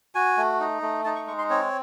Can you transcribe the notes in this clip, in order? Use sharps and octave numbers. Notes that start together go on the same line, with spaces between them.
F#4 G#5
A3
D#4
A3
D#4 A5
C#6
G#3 C#6
C6
C4 C#5